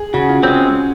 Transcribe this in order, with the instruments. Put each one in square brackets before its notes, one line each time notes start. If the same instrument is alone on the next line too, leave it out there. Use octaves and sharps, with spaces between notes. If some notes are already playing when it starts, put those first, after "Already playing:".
Already playing: [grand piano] G#4
[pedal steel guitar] C#3 [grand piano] F#4
[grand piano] F4
[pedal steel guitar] G#3 C4 [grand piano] C#4